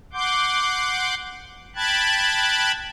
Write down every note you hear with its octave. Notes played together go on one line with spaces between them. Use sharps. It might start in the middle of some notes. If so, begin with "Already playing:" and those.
F#5 C6 D6 G6
G5 A5 B5 F#6 G#6 A6